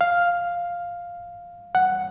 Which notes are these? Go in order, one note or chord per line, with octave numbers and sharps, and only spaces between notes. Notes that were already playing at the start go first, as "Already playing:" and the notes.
F5
F#5